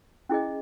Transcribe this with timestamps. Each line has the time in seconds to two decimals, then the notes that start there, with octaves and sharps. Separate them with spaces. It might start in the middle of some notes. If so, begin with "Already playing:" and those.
0.29 C#4 E4 G#4 D#5